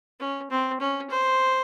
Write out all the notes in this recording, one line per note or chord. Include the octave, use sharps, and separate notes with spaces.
C#4
C4
C#4
C5